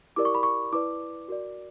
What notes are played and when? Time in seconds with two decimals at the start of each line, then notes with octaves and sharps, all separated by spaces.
0.16 E4 G4 A#4 D5 D6
0.25 C#6
0.35 B5
0.43 C#6
0.73 E4 B4 D5 D6
1.28 F#4 A#4 D5